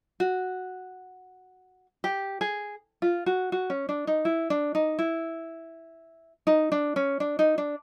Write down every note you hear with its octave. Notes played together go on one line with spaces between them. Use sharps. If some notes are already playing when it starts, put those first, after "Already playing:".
F#4
G4
G#4
F4
F#4
F#4
C#4
D4
D#4
E4
D4
D#4
E4
D#4
D4
C#4
D4
D#4
D4